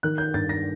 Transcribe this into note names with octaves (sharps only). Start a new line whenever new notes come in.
D#3 F#6
G6
G2 A6
A#6